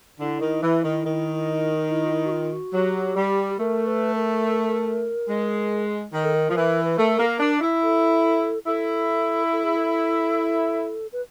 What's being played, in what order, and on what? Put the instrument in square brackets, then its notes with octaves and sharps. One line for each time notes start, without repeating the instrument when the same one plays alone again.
[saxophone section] D3 [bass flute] E4
[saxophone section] D#3
E3
D#3
D#3
[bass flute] E4
F4
E4
F#4
F4
F#4
[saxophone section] F#3 [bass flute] G4
[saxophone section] G3
[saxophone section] A3 [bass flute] A#4
[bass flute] B4
A#4
[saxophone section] G#3
[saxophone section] D#3 [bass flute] A#4
[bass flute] A4
A#4
[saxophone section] F3
E3
[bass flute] B4
[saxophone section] A3 [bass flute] A#4
[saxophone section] A#3 [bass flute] A4
[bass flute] A#4
[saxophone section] D4
E4
[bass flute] A4
[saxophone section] E4 [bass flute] A4
[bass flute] A4
G#4
A4
B4